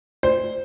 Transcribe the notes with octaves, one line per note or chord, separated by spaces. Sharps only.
C5